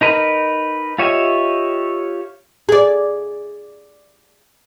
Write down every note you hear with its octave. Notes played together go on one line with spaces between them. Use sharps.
D#4 A#4 B4
F4 G4 C#5 D#5 E5
G#4 D5